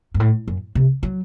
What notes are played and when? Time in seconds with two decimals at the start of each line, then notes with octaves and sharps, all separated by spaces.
0.14 G2
0.20 A2
0.48 F#2
0.75 C3
1.03 F#3